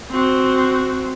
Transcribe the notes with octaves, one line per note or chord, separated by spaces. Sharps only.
C4 F#4